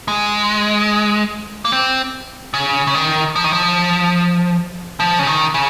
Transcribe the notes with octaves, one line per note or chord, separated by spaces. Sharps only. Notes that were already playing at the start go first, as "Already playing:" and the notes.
G#3
A#3
C4
C#3
C#3
D#3
F3
D#3
F3
F3
C#3
D#3
C#3